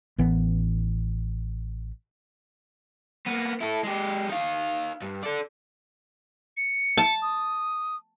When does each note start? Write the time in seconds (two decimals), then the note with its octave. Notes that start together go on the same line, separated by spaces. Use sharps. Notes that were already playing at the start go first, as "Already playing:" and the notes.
0.18 A1 E3 B3
3.26 A#3 B3
3.61 E4 A4
3.84 G#3 G4
4.30 D#4 F5
5.02 G2
5.23 A4 D5
6.57 C#7
6.97 A5
7.22 D#6